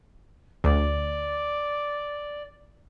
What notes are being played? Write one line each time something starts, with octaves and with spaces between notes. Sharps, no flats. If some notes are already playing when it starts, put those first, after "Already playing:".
D2 D5